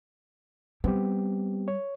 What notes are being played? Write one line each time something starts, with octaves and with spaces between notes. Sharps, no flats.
G3 B3 C4 G4
C#5